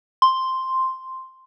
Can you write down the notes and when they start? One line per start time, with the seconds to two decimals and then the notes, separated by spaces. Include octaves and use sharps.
0.22 C6